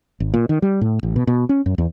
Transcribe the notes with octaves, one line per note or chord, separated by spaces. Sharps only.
G#1
A#2
D#3
G3
A2
A1
B2
B2
C#4
F#2
E2